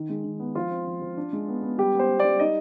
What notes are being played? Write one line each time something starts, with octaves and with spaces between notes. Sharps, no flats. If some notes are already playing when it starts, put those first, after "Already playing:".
Already playing: D#3
G#3
D#3
B3
F3 F4
C4
F3
F3
D4
G#3
B3
B3
G3 G4
B3
C5
B3
D5
G3
D#4 D#5